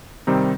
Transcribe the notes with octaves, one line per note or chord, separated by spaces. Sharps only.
C3 D#3 G3 C4 D#4